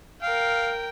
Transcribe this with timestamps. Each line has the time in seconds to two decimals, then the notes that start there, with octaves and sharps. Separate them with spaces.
0.22 A#4 F5 G5